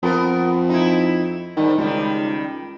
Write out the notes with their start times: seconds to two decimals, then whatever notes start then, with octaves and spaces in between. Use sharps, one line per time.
0.03 F2 B3 A#4
0.69 D#4 E4
1.57 G#2 D#3 G3
1.78 C#2 D#3 G3